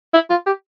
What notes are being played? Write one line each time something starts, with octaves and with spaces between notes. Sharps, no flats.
E4
F4
G4